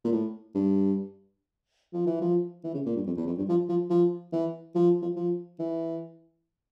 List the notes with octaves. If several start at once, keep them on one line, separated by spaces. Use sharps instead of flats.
A#2
A2
G2
F3
E3
F3
E3
C#3
A#2
G2
F2
E2
F2
G2
F3
F3
F3
E3
F3
F3
F3
E3